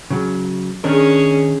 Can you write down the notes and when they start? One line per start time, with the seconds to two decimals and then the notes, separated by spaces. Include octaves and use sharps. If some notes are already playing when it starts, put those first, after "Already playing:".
0.10 C#3 F#3
0.84 D#3 C#4 D4 G#4 A#4